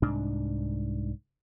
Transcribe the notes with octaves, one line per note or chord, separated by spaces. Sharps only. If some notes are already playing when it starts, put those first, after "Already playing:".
C2 G#2 D4